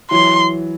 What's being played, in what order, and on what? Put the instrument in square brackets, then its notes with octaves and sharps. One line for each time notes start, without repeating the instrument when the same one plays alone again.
[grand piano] E3 F#3 [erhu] C6